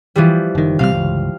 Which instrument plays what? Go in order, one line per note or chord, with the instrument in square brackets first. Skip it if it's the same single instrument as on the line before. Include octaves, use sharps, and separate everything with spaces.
[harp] E3 F3 G3
[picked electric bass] F#1 D#3
[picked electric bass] B1 C3 G3 [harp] F5 F6
[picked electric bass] G1 C#2